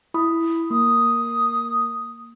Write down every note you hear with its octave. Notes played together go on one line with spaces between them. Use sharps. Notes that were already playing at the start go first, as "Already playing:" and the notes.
E4 B5 D#6
A#3 D#6